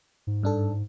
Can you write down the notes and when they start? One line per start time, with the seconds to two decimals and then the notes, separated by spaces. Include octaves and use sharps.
0.27 G#2
0.43 G2 D4 A4